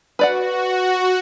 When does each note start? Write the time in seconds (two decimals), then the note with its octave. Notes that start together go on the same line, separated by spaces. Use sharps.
0.19 F#4 B4 D5 F#5